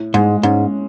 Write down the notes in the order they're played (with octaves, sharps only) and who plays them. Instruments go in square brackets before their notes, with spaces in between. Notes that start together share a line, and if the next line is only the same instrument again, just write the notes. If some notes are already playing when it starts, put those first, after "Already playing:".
Already playing: [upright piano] A2
[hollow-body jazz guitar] G#2 [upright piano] G#3
[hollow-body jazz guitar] G#2 [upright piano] C#4